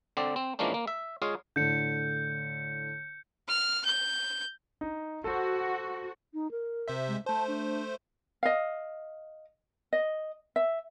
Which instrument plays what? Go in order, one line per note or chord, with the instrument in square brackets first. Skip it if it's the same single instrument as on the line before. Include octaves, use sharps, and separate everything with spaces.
[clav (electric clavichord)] D3 C4 D5
C4
E3 F3 G#3 A#3 C#4 D4
A#3
E5
G#3 F4 G#4 C#5 F5
[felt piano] A2 D3 [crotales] G6 C#7
[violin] F6
G6
[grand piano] D#4
[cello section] F#4 [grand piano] A4 C5
[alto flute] D#4
A#4
[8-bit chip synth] C3 C5 E5
[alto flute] G#3
[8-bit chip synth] A3 C5 [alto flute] A5
[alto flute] D4
[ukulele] D#5 F5
D#5
E5